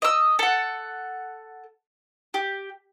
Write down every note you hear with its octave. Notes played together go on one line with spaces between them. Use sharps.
D#5 E6
A4 F#5
G4